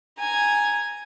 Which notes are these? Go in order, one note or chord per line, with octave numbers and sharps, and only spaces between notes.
G#5 A#5